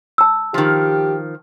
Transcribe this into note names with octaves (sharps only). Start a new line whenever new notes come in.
A5 E6
D#3 F3 G4